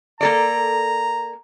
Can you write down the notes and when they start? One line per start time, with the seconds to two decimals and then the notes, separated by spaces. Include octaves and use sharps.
0.21 A#3 A4 D5 A#5